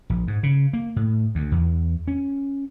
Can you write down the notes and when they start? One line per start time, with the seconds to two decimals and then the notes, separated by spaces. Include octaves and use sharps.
0.10 A#1
0.28 G#2
0.43 C#3
0.73 A#3
0.96 A2
1.35 D2
1.52 E2
2.08 C#4